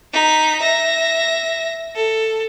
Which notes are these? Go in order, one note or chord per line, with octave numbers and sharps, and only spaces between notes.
D#4 B6
E5 A#6
A4